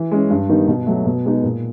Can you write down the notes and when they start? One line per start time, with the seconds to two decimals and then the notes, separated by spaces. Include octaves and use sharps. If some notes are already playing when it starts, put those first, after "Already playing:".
Already playing: E3
0.11 G#3 C#4
0.30 G2
0.49 D#3 G3 B3 D#4
0.67 B2
0.86 F#3 A3
1.05 B2
1.25 G#3 B3 D#4 G#4
1.43 A#2